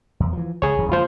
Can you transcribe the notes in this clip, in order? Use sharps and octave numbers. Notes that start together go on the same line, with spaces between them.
E2
E3 F3
C#2 G#4 C#5
D#1 F#2 E3
C#2 G#3 A#3 F4 C5